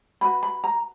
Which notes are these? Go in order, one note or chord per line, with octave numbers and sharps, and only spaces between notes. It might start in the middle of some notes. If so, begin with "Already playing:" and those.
D4 F#4 B4 B5
B5
A#5